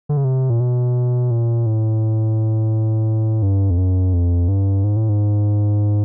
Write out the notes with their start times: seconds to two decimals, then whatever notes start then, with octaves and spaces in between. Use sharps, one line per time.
0.09 D3
0.17 C#3
0.24 C3
0.50 A#2
0.60 B2
1.31 A#2
1.66 A2
3.43 G2
3.70 F2
3.78 F#2
4.14 F2
4.48 G2
4.84 G#2
4.96 A2
5.09 G#2